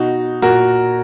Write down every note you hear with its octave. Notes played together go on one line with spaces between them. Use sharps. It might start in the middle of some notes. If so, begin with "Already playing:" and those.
Already playing: B2 D#4 F#4
A#2 F#4 A#4